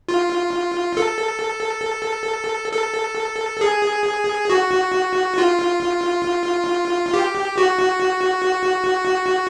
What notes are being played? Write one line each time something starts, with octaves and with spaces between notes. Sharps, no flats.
F4
A4
A4
G#4
F#4
F4
G4
F#4